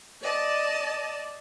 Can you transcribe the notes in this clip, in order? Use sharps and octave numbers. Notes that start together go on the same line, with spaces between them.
D5 D#5 A5